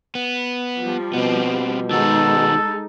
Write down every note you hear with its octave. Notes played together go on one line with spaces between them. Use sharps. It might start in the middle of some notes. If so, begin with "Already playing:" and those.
B3
F3 G3
B2 B3 C4
D#3 G#3 D#4 F#4 A4